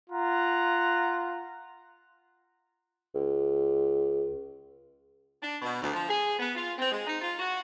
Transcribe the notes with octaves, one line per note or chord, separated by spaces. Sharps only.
F4 F#5 A#5
C#2
D4
B2
D2
F3
G#4
B3
F4
C4
G#3
D#4
F4
F#4